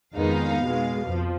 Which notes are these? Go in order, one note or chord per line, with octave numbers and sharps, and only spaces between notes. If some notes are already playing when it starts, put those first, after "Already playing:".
F2 D#3 G#3 B3 D#4 F5
B2 G#3 B3
F2 F3